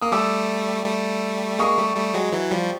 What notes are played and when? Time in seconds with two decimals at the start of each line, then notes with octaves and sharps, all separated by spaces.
0.02 A#3 D#6
0.12 G3 A3 D6 E6
0.85 G3 A3
1.59 G#3 A#3 C#6 D#6
1.78 G3 A3
1.96 G3 A3
2.14 F#3 G#3
2.32 E3 F#3
2.51 F3 G3